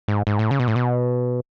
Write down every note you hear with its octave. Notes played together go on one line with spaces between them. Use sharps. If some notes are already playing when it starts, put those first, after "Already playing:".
G#2
G#2
A2
C#3
B2
A2
B2